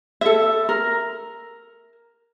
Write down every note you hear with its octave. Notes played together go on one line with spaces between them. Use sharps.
A4 E5
A#4